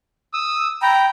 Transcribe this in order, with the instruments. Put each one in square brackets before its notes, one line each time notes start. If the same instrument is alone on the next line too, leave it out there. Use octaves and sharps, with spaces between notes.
[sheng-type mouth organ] D#6 E6
[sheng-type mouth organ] G5 A#5 [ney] B5